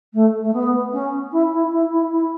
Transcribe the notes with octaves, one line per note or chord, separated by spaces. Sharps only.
A3
A3
B3
C#4
E4
E4
E4
E4
E4